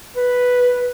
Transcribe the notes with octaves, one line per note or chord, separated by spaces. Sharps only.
B4